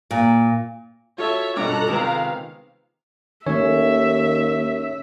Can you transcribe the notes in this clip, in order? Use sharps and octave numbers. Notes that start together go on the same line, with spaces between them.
A#2
F4 F#4 A4 C#5 E5
G2 B2 A4 A#5 D6 F#6
C3 D#3 G#3 B3 C#4 F5
D#2 D#3 A3 C#4 C#5 E5